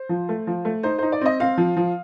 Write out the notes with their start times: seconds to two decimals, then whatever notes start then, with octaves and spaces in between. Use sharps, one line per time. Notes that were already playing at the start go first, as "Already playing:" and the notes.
Already playing: C5
0.09 F3
0.29 A3
0.47 F3
0.65 A3
0.83 D#4 C5
0.98 D#4 C5
1.12 D5
1.21 C4 D#5
1.40 C4 F5
1.57 F3
1.77 F3